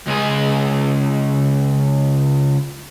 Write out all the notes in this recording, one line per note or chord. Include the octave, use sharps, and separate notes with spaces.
C#2 G#4